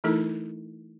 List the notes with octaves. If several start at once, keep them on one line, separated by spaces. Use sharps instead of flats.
E3 A3 D#4 E4 A4 A#4